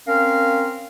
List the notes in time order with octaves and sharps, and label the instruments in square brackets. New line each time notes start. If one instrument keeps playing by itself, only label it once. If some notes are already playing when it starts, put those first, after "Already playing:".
[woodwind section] C4 C#4 A#4 F5